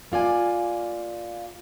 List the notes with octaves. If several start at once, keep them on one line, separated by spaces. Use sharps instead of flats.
A#3 F4 D5 G#5